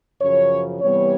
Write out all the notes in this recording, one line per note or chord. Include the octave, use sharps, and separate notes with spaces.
F#2 C#3 F3 C#5
C3 E3 G3 B3 C#5